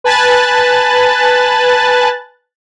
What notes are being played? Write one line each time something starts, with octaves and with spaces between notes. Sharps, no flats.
B4 G#5 A5 B5 F#6 A6